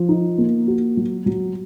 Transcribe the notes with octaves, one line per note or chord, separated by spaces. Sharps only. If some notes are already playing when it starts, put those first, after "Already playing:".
Already playing: F3
D#4
A#3
F#4
F#3
F#3